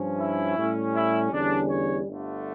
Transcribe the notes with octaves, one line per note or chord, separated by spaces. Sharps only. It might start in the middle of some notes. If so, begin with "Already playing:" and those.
Already playing: G2 F3 C#4
E4
A2 G3 C#4
E4
E2 D3 G3 C#4 D4
C#5
G1 G2 D3 A3